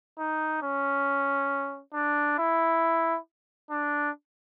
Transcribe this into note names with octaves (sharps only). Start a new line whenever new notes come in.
D#4
C#4
D4
E4
D4